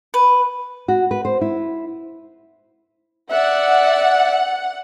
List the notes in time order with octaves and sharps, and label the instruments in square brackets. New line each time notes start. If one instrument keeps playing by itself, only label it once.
[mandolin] B4
[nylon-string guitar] F#4
B4
C5
E4
[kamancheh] D5 E5 [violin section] F#5